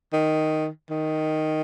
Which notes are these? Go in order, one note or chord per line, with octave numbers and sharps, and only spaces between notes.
D#3
D#3